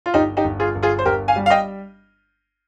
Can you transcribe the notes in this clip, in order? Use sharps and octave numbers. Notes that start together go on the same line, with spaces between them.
F4
G1 D#4 G4
D#4 G4
G1
F4 G#4
G1
F4 G#4
C5
G1 G4 A#4
F5 G#5
G3
F5
D#5 G5